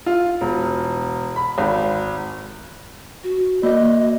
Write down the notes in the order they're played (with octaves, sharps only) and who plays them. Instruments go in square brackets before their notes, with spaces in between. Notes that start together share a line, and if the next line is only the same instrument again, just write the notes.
[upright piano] F4
E1
B5
G#1
[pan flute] F#4
[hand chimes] A#3 D5 [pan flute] D#5